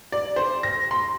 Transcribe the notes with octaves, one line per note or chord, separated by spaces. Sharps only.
D5
C5
A#6
C6